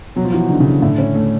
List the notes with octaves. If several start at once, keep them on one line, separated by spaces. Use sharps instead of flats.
B2 F#3
F3
E3 F#3
D3 D#4
C#3
D3 D#4
A2 D3
C#4
A3